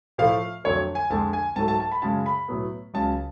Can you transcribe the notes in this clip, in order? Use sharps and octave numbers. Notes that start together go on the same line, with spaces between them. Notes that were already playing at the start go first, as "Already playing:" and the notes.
A2 F3 A3 F5
F2 D3 F#3 A3 C#5
G#5
F2 D3 G#3 A5
G#5
G#2 F#3 A3 A5
A5
A5
B5
F#2 C#3 G#3 A5
B5
A2 F#3 B3
C#2 C#3 F#3 A5